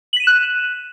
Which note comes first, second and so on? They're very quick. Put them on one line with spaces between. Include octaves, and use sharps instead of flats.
F#7 B6 D#7 E7 F#6